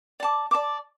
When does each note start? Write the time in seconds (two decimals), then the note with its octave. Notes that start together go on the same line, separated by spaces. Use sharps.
0.20 D5 A5 D6
0.51 D5 A5 D6